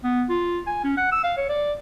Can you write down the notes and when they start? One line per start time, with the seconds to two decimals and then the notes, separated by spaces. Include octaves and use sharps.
0.04 B3
0.29 F4
0.67 G#5
0.84 C#4
0.97 F#5
1.12 E6
1.24 F5
1.37 C#5
1.49 D5